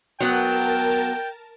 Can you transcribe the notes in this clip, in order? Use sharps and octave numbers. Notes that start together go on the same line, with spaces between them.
F#3 B3 A#4 G5 A5